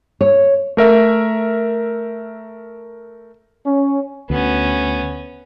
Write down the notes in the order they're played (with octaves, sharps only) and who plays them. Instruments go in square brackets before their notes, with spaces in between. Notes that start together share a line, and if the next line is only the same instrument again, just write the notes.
[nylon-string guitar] C#5
[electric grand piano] A3 A#4 E5
[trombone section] C#4
[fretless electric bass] D2 [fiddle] B3 C#4